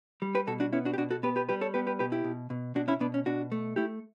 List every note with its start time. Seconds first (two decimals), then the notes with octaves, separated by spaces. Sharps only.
0.22 G3
0.35 G4 B4
0.47 B2 F#4 A4
0.60 D4 F#4
0.73 B3 C#4 E4
0.85 D4 F#4
0.94 G4
0.98 B2 D4 F#4
1.11 F#4 A4
1.23 B3 G4 B4
1.36 G4 B4
1.49 G3 G4 B4
1.61 A4 C#5
1.74 B3 G4 B4
1.87 G4 B4
1.99 B2 G4 B4
2.12 E4 G4
2.24 B2
2.50 B2
2.75 B2 D4 F#4
2.88 C#4 E4
3.00 B2 B3 D4
3.14 C#4
3.26 B2 D4 F#4
3.52 A3
3.76 A3 E4 G4